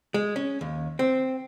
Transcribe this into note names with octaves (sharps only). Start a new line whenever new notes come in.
G#3
C#4
D#2
C4